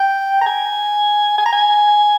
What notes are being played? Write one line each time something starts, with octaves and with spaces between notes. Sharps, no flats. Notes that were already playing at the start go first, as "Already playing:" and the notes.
Already playing: G5
A#5
G#5
G#5
A#5
G#5